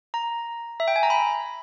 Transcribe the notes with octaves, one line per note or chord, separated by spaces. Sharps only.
A#5
E5
G5
G#5
A#5
B5